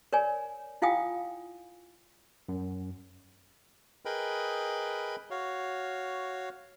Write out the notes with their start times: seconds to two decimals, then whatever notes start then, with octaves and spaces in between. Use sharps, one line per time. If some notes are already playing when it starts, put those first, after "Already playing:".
0.13 A#4 C#5 D5 G#5
0.82 E4 F4 F5 G5 G#5 D#6
2.49 F#2
4.05 G#4 A#4 B4 D#5 G5 B5
5.30 F#4 C#5 F5